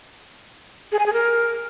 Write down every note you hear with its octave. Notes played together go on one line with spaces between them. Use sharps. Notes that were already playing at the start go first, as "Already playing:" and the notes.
G#4
G#5
G#4
A#4